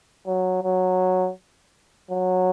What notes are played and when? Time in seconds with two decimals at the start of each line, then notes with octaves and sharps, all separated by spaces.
0.27 F#3
0.64 F#3
2.11 F#3